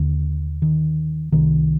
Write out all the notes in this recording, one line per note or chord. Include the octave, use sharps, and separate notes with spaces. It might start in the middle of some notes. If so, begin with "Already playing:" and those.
Already playing: D#2 D3
D#3
C2 C3 D#3